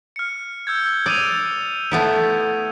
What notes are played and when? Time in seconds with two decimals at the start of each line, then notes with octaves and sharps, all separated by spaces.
0.16 F6 C#7
0.67 E6 G6 G#6
1.06 D5 D#6 D#7 F7
1.92 A3 B3 E4